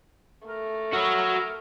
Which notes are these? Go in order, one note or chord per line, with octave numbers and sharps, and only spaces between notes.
A3 A#4
F#4 A#4 C#5 B5 D#6 E6